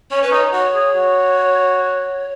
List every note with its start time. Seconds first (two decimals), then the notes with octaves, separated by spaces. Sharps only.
0.11 C#4 C#5
0.21 C#4 B4
0.31 D#4 C#5
0.52 F#4 C#5
0.74 G#4
0.95 F#4